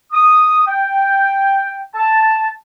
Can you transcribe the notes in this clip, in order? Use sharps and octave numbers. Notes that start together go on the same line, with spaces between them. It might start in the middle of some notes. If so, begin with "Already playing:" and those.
D#6
G5
A5